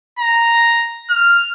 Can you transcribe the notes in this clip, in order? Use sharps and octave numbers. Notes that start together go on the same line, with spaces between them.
A#5
F6